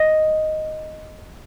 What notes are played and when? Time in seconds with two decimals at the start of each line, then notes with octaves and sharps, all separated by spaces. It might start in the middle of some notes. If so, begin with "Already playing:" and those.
Already playing: D#5